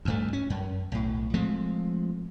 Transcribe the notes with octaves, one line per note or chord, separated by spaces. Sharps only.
D2 G2 A3
C#4
F#2
B1 A2
F3 G#3 A3 C4